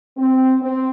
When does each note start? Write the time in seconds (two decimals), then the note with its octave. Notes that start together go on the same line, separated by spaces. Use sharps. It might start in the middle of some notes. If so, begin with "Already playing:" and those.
0.17 C4
0.61 C4